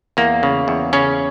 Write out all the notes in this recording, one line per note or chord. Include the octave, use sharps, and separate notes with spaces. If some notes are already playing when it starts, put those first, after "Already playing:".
E2 A#3
C#3
E2
C#3 C#4